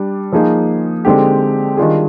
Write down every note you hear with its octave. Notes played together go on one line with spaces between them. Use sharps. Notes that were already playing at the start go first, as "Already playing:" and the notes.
Already playing: G3 D4
F3 A#3 D#4 G#4
D3 G#3 C4 D#4 G4
D#3 G3 D4 F4 G#4